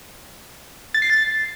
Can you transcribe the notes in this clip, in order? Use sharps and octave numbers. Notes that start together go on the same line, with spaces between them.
A6
C7
A6